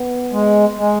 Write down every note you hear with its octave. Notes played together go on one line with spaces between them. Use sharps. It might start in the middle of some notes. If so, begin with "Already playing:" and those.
Already playing: B3
G#3
G#3